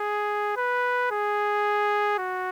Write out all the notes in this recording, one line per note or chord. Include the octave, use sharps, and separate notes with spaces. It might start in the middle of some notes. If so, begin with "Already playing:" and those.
Already playing: G#4
B4
G#4
F#4